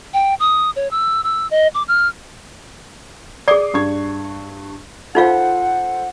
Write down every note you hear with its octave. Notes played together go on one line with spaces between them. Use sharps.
G5
D#6
C#5
E6
E6
D#5
D6
F6
G#4 D5 D6 D#6 C7
G2 C#6 G#6
D#4 F4 A4 C5 F5 F#5